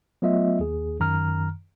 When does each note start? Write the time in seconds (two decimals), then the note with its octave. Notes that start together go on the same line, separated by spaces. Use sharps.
0.22 F#3 A3 B3 F4 D#5 E5
0.60 D#2 G#4
1.00 F#2 D#3 A#5 F6